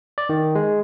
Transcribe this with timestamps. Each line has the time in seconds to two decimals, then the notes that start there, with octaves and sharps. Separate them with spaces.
0.18 D5
0.29 D#3
0.55 G#3